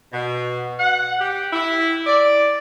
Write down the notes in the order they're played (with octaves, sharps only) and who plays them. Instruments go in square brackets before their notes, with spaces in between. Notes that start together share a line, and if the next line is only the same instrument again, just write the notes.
[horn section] B2
F#5
G4
E4
D5